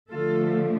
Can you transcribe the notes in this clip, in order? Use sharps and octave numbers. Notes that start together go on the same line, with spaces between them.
D3 F3 A3 F4 A4